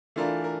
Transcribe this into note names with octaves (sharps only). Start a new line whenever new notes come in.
E3 A3 D4 F4 A#4
A#4